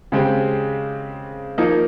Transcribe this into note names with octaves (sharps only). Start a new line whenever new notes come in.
C#3 G#3 C4 G4
F3 A#3 D#4